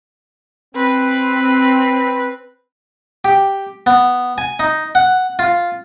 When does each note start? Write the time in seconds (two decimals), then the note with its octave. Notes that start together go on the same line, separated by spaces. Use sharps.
0.75 C4 B4
3.25 G4
3.86 B3
4.38 G#5
4.60 D#4
4.95 F#5
5.39 F4